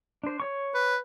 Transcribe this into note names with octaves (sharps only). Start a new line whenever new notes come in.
D4 C5
C#5 C#6
B4